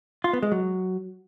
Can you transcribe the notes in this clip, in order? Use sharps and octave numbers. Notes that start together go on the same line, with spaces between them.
F4
B3
G#3
F#3